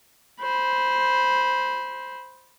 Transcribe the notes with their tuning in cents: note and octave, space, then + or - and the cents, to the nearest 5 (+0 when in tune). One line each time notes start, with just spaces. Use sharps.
C5 +0 B5 -15